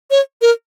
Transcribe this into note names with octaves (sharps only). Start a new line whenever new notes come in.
C#5
A#4